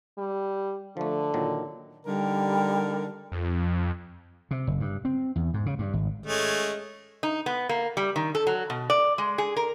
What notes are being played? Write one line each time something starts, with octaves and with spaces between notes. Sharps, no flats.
G3
D3 F3 A3
A#2 D#3 F#3
D3 G3 D#4 A#4
F2
C3
F#1
G2
C4
E2
G#2
C#3
G2
G#1
G#3 A3 C#4
D#4
B3
A#3
G3
D#3
A4
F#3
B2
D5
G#3
G#4
A#4